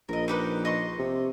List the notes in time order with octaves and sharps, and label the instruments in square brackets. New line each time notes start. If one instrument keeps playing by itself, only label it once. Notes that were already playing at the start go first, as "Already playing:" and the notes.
[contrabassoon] A#1 [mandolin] A#4 D#5
[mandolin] D#4 G4 B4
D#5 C6 C#6
[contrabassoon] C3